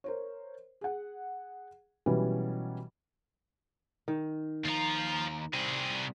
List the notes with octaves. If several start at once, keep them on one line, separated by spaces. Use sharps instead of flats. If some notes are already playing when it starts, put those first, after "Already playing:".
A#4 C5 C#5
G#4 F#5
B2 E3 F#3 G3 C#4
D#3
D#2 F3 F4 A#5
C3 G3 C4 G#4